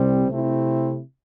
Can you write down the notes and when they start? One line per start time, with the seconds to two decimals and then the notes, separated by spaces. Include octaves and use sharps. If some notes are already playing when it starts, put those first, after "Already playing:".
Already playing: C2 C3 G3 C4
0.29 C3 A3 C4 E4